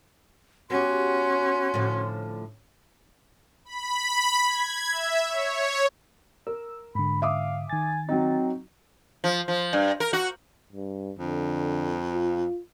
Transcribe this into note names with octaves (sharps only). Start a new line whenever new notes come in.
B3 C#4 F#4 G4 C6
A2 D3 F3
B5
G#6
E5
C#5
A#4 E6
G#2 D3 B5
E5 F5 D6 D#6
D#3 G#5 A6
F#3 C4 D#4
F3
F3
G2
A#4
F#4
G2
F2 D3
F4